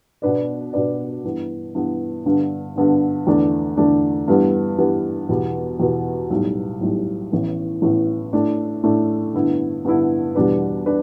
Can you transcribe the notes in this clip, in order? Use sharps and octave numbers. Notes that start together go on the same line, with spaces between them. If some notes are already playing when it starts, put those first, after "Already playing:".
B2 B3 D4 B4 D5
B2 B3 D4 B4 D5
G2 E3 B3
G2 E3 B3
G2 D3 B3 D4
G2 D3 B3 D4
E2 D3 A3 D4
E2 D3 A3 D4
G2 E3 G3 B3
G2 E3 G3 B3
E2 B2 B3 G4
E2 B2 B3 G4
B1 A2 G3
B1 A2 G3
A1 A2 E3 B3
A1 A2 E3 B3
A2 A3 D4
A2 A3 D4
G2 D3 B3 E4
G2 D3 B3 E4
E2 B2 G3 D4 B4
D4 B4